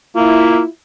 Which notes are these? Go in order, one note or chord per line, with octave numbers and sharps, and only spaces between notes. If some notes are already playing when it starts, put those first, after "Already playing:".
A#3 E4 F4